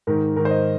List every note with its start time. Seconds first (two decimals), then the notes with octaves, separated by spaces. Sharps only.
0.07 G#2 D#3 A#4
0.36 G#2 D#3 A#4
0.45 C5
0.51 D#5